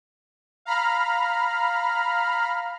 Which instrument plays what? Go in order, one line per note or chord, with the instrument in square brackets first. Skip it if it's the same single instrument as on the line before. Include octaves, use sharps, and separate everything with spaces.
[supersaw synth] F5 A#5 B5 F6